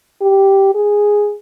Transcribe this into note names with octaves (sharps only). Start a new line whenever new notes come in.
G4
G#4